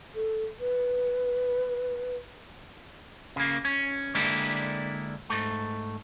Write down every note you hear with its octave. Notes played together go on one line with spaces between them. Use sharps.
A4
B4
C#3 A#3
C#4
D3 G#3 A#3 D4 E4 G4
G#2 A3